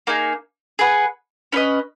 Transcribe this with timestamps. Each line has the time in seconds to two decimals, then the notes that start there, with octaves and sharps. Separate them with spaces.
0.07 A#3 D#4 G#4
0.79 G#4 B4 F#5
1.52 C#4 E4 B4 D#5